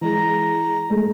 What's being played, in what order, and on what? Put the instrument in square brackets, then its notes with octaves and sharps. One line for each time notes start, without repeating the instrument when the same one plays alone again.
[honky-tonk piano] E3 G#3 [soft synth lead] A#5
[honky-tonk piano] G#3 A3